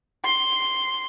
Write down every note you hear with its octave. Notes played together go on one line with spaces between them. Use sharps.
C6